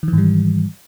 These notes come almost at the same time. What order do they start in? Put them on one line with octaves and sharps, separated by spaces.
D#3 E3 G#2 G3